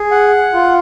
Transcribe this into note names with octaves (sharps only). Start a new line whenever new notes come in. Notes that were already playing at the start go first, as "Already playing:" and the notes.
Already playing: G#4
F#5
F4